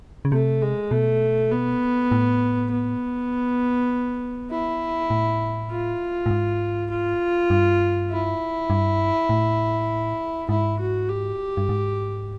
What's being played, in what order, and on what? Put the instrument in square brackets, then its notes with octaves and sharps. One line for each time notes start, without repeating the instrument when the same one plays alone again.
[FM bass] C#3
[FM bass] C3 [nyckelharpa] A3
[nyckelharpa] G#3
[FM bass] B2 [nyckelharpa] A3
[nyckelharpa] B3
[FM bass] A2
[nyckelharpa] B3
E4
[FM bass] A2
[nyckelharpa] F4
[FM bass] A2
G#2
[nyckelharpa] F4
[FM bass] G2
[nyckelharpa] E4
[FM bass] G2
A2
[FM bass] G#2 [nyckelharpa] E4
[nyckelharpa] F#4
G4
[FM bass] G2
G#2